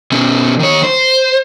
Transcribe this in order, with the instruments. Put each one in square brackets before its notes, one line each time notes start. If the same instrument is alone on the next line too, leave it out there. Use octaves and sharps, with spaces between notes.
[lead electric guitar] B2 C#4
D#3 C#5
C5